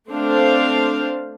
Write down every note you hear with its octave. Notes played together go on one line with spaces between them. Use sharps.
A3 C4 D4 C5 F5